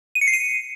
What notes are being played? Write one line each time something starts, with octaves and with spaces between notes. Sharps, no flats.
D#7
C#7
C7
D#7